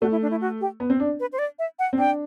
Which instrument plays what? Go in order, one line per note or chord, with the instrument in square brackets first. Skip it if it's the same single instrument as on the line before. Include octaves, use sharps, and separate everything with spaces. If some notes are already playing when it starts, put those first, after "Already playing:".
[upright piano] A3 [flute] F#4
[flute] E4
D4
E4
F#4
G4
[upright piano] B3
C4
D4
[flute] B4
C5
D5
E5
F#5
[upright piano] C4
[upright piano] D4 [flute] G5